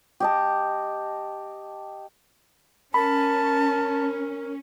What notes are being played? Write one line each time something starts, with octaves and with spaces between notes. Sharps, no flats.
G4 D#5 A5
C#4 A#4 A5 B5